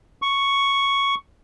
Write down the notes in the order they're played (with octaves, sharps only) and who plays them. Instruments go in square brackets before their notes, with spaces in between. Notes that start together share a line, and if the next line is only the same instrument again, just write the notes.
[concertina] C#6